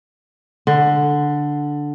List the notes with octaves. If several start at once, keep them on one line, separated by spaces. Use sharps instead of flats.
D3